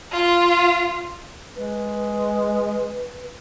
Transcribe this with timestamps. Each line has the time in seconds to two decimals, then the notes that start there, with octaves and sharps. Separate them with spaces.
0.12 F4
1.56 G#3 B4